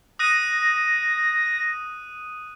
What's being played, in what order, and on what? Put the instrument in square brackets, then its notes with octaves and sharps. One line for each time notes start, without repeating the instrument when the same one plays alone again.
[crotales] D#6 F#6 D#7 [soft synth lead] A#6